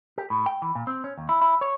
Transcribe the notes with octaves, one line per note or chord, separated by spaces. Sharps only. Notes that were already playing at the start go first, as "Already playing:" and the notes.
G4
A2
G5
E3
A#2
C4
C#4
D#2
E4
E4
C#5